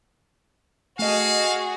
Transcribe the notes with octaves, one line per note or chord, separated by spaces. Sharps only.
A3 F#4 G#4 D#5 F5